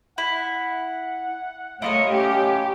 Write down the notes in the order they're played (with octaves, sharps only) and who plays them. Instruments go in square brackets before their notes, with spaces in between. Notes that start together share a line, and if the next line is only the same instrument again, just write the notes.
[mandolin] E4 [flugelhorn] F#5
[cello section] A3 C#5 D#5 [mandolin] E4 F4 A#4
[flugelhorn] C#4 [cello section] G4